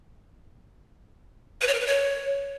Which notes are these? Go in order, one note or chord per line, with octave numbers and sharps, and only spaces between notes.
B4
C#5
A#4
B4
C#5